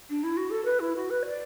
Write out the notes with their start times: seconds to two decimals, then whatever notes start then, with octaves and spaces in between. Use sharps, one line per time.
0.10 D4
0.23 E4
0.37 F#4
0.50 A4
0.65 B4
0.80 E4
0.96 F#4
1.10 B4
1.26 D5